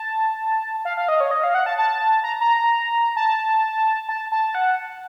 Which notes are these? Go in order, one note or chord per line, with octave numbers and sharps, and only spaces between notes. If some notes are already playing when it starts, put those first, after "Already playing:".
Already playing: A5
F5
F5
D#5
C#5
D#5
F5
F#5
A5
A5
A#5
A#5
A5
A5
A5
F#5